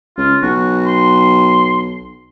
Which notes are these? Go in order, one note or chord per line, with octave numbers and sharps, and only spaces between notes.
C#2 F4
B1 F#4
C6